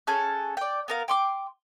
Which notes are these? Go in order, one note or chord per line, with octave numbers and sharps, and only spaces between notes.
C#4 G#4 A4 F#6
D5 G5
B3 A#4 F5
G5 C6 D6